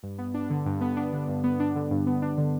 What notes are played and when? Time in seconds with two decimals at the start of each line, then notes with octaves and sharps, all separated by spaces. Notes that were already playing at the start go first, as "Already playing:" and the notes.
0.03 G2
0.18 B3
0.34 D4
0.50 D3
0.66 G2
0.81 B3
0.97 D4
1.13 D3
1.28 G2
1.44 B3
1.60 D4
1.75 D3
1.91 G2
2.07 B3
2.22 D4
2.38 D3